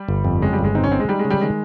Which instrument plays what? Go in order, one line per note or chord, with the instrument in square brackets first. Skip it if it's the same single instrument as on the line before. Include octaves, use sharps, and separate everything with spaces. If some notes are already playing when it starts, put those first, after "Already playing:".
Already playing: [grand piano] G3
[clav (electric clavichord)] G1
F2
[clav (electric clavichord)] C#3 [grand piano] G#3
[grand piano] G3
[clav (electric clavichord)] G1
[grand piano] G#3
[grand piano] C4 [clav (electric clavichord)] D#4
[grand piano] C#4
[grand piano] C4 [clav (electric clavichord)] D#4
[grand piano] G#3
[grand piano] G3 [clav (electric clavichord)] D#4
[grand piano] G#3
[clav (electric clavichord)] C#3
[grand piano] G3
[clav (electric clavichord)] D#3 [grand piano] G#3